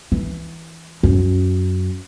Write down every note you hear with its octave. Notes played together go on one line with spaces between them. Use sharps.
E3
F#2